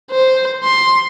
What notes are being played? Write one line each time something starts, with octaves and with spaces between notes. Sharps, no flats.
C5
C6